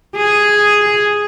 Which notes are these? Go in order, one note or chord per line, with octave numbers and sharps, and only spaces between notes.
G#4